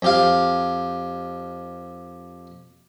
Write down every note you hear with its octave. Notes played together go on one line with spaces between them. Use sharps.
F2 G4 F5